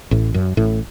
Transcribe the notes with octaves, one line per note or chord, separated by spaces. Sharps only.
A1 A2
F#2
A1 A2